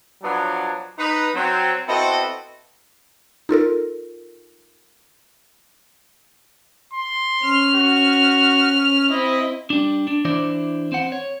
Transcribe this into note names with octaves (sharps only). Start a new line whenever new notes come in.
F3 F#3 B3 D4
D#4 B4
F#3 C4
B3 C4 E4 F#4 A4 D#5
D#4 F4 A4 A#4
C6
C#4 F6
F#4
C4 E4 D#5
G3 D4
D4
E3 D4 E4 C5 D5
C4 C5 F#5
C#5